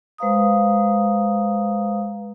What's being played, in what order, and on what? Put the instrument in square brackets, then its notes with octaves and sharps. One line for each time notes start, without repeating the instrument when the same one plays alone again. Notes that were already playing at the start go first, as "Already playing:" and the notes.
[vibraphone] G#3 B4 C5 F5 A#5 D#6